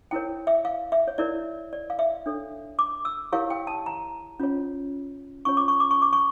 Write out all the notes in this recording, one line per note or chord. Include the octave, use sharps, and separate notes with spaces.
E4 A#4 C#5 G5
E5
F5
E5
C#5
E4 A#4 C#5 D5
D5
F5
E5
D4 A4 C#5
D6
E6
E4 G4 A#4 C#5 F5
G5
A5
A#5
C#4 F4 C#5
C#4 F4 C#5 C#6
D6
C#6
D6
C#6
D6
C#6